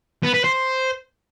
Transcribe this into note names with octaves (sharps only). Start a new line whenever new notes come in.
B3
B4
C5